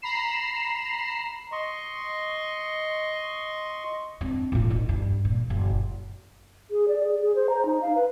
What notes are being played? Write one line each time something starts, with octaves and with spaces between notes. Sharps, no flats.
A#5 B5 C7 E7
D#5 C6 C#6
C4 D4
A2 F4
D#4
G2
A#2
F#1
G#4
D5
G#4
G#4
C5
A#5
D#4
F5
B4